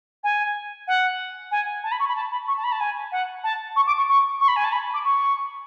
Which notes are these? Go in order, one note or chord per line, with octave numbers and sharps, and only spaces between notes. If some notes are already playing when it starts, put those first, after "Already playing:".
G#5
F#5
G#5
A5
B5
C#6
B5
A5
B5
C#6
A5
B5
A5
G#5
F#5
A5
C#6
D6
C#6
C#6
C#6
B5
G#5
A5
B5
D6
C#6